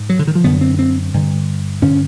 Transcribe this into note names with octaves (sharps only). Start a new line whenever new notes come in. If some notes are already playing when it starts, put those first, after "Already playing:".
Already playing: G#2
F#3
D3
D#3
F3
F#2 D3 B3
C4
C4
G2 D3
G2 D3 C#4